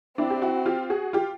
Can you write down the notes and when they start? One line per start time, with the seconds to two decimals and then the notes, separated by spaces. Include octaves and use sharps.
0.18 C4 D4 E4
0.30 G4
0.42 E4 F#4
0.65 F4 G4
0.90 F#4 G#4
1.13 F4 G4